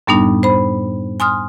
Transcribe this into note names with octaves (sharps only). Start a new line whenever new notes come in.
F#2 A2 G3 B3 D4 D#4
C5 B5
G#5 C6 D#6 F6